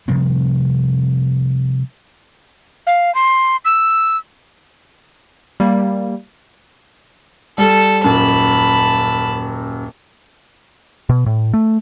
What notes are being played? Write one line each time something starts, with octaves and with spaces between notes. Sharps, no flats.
C3 F3 G3 C4
F5
C6
E6
G3 A#3
G3 A4
D#1 F#2 A5 B5
B2
A2
A3